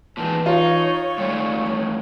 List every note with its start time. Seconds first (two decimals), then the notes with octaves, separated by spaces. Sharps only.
0.17 A#2 D#3 E3 G#3 A5
0.46 D#4 F4 C#5
1.18 G#2 D#3 G3 A3